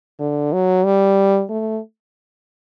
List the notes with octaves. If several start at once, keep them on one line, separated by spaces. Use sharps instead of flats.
D3
F#3
G3
A3